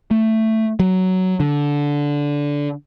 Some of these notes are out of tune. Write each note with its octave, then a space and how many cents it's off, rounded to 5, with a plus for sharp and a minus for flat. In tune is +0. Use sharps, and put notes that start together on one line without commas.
A3 +10
F#3 +10
D3 -15